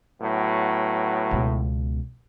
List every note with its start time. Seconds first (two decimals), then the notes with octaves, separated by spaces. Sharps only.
0.21 A2 F#3 B3
1.31 C#2 B2